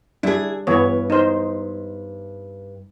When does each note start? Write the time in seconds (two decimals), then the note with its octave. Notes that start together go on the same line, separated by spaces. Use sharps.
0.23 G3 D4 E4 G#4
0.67 G2 E3 B3 C#5
1.10 D#4 C5